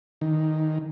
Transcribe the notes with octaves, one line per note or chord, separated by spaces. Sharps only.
D#3